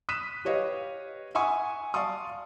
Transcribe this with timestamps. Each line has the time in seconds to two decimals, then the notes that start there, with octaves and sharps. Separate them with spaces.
0.09 D#6 F#6 B6 D#7 E7
0.45 G4 B4 C#5 D#5 F5
1.35 E5 F#5 G#5 C#6 D#6
1.94 D5 F5 A5 C6 C#6 D#6